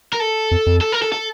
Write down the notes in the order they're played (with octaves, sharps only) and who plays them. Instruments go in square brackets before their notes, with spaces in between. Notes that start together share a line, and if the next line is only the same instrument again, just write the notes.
[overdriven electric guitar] A#4
A4
[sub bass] F2
F2
[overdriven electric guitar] A4
A#4
A4
A4